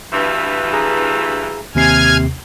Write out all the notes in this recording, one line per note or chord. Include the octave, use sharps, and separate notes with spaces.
D2 G2 E3
G#4 A#5
D#2 C3 G#5 F6 G#6 C7